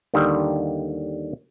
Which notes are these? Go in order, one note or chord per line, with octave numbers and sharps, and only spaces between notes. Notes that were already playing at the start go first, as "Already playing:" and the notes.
D#2 D3 D#3 G3